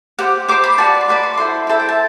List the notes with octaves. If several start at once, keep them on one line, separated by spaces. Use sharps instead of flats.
G4 C5 F#5
G4 C5 D6
B5
F#4 B4 D5 A5
C6
F#4 B4 D5 B5
C6
E4 A4 C5 C6
E4 A4 C5
G5
A5